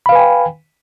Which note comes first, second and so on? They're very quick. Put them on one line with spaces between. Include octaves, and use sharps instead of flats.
B5 F5 B4 G#5 G5